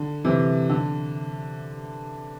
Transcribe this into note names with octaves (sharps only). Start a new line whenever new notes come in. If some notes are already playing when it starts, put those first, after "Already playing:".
Already playing: D3
C3 E3
D3